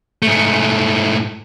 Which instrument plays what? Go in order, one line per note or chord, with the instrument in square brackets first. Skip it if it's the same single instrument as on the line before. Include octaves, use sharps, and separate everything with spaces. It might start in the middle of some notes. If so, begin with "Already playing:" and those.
[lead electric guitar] G#2 A3